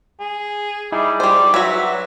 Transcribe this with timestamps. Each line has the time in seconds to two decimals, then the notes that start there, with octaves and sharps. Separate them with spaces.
0.20 G#4
0.92 G3 D#4 E4 G#4
1.20 G3 C5 D5
1.54 F#3 F#4 B4 C#5 E5 E6